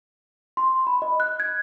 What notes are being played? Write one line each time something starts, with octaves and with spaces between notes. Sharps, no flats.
C6
B5
D#5
F#6
G#6